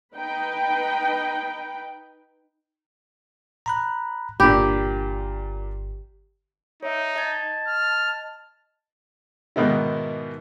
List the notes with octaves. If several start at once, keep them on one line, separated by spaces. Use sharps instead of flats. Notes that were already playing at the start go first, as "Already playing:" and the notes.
D#4 B4 G5
A#5 B5 F#6
G1 A#2 D4 G4 B5
D#4 C#5 E5
D#5 A5 G#6
F6
G#2 B2 D#3 B3 D#4 E4